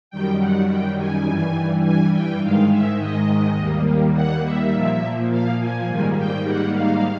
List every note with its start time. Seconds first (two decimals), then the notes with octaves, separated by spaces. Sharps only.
0.11 F#2 D#3 G3 G5
0.39 F#5
0.69 G5
0.98 G#5
1.27 G2 E3 G3
1.84 G#5
2.14 G5
2.42 G#2 D#3 G#3 F5
2.71 E5
2.99 D#5
3.57 D#2 D#3 G3 A#3
4.14 F#5
4.44 E5
4.73 A#2 F3 A#3
5.31 F5
5.59 G#5
5.88 G#2 D#3 G3 A#3
6.17 G5
6.46 F#5
6.75 F5